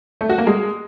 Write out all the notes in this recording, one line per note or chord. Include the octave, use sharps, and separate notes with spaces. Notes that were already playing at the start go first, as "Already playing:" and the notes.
A3
F#4
A#3
G#3